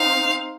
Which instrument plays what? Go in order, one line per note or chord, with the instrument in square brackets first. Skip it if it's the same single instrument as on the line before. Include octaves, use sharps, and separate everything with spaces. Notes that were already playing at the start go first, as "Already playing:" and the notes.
Already playing: [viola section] C4 D#4 C5 [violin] F5